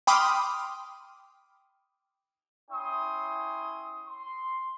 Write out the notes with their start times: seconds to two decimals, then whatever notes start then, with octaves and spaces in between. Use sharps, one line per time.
0.07 G5 B5 C6 D6 D#6 F6
2.71 C#4 E4 G5 C6 D#6
4.07 C6